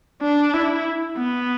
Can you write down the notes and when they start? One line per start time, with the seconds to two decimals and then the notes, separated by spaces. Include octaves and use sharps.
0.22 D4
0.54 E4
1.18 B3